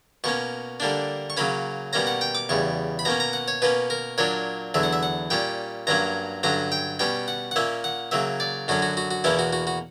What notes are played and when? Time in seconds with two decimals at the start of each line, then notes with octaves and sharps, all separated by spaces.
0.24 B2 A#3 C#4 C#6
0.80 D3 G3 A#3 D4
1.30 C#6
1.37 C#3 F#3 A#3 C#4 B5
1.93 B2 G3 A#3 C#4 A#5
2.07 F#5
2.21 G5
2.35 D6
2.49 E2 C#3 G3 C#6
2.99 B5
3.05 B2 A#3 C#4 A#5
3.20 A#5
3.33 F#5
3.48 C#5
3.62 B2 A#3 C#4 B4
3.90 A#4
4.18 A#2 F#3 A#3 D4 C#5
4.74 E2 D3 F#3 E5
4.83 F#5
4.93 E5
5.03 F#5
5.30 A#2 G3 C#4 G5
5.87 G2 F#3 A#3 C#4 A#5
6.43 G2 D3 F#3 C#4 A#5
6.72 G5
6.99 B2 G3 C#4 G5
7.28 F#5
7.51 F#5
7.56 A#2 A#3 C#4 E5
7.84 F#5
8.11 C#3 F#3 A#3 E5
8.40 D5
8.68 F#2 D3 F#3 C#4 F#4
8.82 F#4
8.97 F#4
9.11 F#4
9.24 E2 B2 A#3 C#4 E4
9.39 F#4
9.53 F#4
9.67 F#4